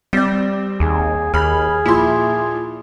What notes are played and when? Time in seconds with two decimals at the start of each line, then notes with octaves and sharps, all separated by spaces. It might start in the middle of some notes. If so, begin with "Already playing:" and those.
0.13 G3 C4 D5
0.80 D#2 G#4
1.34 D#2 G#4 B5 F6
1.86 A#2 F3 E4 C6